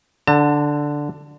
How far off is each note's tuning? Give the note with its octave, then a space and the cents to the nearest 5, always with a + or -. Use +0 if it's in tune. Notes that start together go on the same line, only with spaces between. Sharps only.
D3 +0 A5 +40